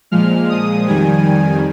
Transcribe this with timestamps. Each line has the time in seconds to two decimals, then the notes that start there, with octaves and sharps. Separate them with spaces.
0.11 A#2 F3 G#3 F6
0.49 D#6
0.87 F2 D#3 G3 G#5